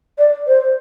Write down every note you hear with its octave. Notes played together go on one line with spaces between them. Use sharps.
D5
C5